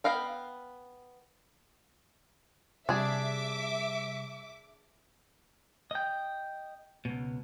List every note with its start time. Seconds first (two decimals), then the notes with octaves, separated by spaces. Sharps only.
0.04 B3 D#5 F5 G5
2.89 C3 G3 D4 G#4 E5 D6
5.91 D#5 G5
7.05 C#2 B2